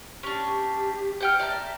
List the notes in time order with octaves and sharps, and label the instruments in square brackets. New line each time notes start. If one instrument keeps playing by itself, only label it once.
[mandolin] C#4 D4 [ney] G4
[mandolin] F#5 G5 F6
[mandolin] D5 A5 A#5 [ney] E5